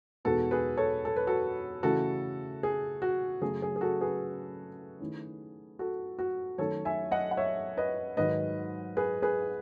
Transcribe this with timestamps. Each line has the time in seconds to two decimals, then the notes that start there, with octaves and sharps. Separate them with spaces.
0.25 E2 B2 G#3 B3 D#4 F#4 A4
0.51 G#4 B4
0.77 A4 C#5
1.05 A4
1.16 B4
1.27 F#4 A4
1.83 C#3 E3 A3 E4 F#4 A4
2.63 G#4
3.02 F#4
3.41 F#2 C#3 F#3 A3 C#4 G#4
3.62 G#4
3.76 G#4
3.81 F#4 A4
4.01 G#4 B4
5.00 D#3 A3 C#4 E4
5.79 F#4 A4
6.19 F#4
6.58 D#3 F#3 A3 C#4 A4 C#5
6.85 E5 G#5
7.11 D#5 F#5
7.31 F#5
7.37 C#5 E5
7.77 B4 D#5
8.17 G#2 D#3 F#3 B4 D#5
8.97 G#4 B4
9.22 G#4 B4